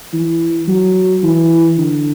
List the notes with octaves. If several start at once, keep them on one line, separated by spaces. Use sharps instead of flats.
E3
F#3
E3
D3